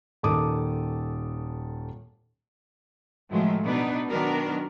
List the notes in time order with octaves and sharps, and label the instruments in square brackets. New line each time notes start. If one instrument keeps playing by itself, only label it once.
[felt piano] D#1 D#3 A4 A5 D6 D#6
[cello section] A2 D#3 F3 F#3 G#3 A3
B2 B3 D4 D#4 B4
D#3 F#3 B3 D4 F#4 A#4